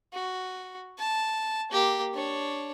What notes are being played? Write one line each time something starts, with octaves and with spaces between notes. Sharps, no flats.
F#4
A5
A#3 G4
D4 C#5